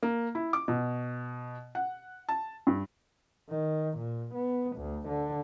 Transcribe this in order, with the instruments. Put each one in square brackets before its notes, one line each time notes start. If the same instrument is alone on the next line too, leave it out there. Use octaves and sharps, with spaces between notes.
[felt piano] A#3
E4
D6
B2
F#5
A5
G2
[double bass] D#3
A#2
B3
D2
D3